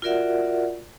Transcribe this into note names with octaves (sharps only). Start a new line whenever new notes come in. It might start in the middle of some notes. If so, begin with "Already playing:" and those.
F4 F#4 A#4 D5 E5 F#5